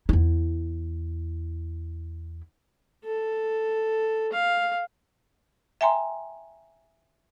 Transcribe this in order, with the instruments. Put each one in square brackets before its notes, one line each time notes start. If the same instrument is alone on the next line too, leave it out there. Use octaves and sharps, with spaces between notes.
[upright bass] E2 E4
[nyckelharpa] A4
F5
[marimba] E5 G5 G#5 A#5 C6